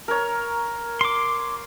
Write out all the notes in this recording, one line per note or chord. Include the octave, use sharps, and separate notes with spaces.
A#4 C#5
C6 D6